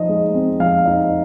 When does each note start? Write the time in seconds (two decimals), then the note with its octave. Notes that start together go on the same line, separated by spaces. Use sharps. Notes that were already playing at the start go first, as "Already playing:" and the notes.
Already playing: F3 D#4 D#5
0.09 G#3
0.35 C4
0.60 F3 F5
0.86 D#4